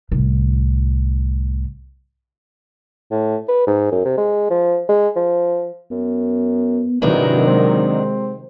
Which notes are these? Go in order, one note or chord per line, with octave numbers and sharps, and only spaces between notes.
C2 A2
A2
B4
G#2
F#2
C3
G#3
F3
G#3
F3
F#2 B3
G#1 C3 D#3 E3 F#3 D4 D#4 A#4
G#3 C4